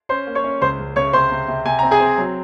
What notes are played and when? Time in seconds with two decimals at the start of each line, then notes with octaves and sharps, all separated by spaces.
0.09 C#4 C5 C6
0.27 A#3
0.35 C#5 C#6
0.44 C#4
0.62 C#2 C5 C6
0.79 C#2
0.96 C#3 C#5 C#6
1.13 C3 C5 C6
1.32 C3
1.48 C3
1.66 C3 G#5
1.79 C4 A#5
1.91 G#4 G#5
2.00 C4
2.18 F#3